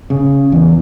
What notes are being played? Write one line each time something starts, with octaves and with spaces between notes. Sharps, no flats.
C#3
E2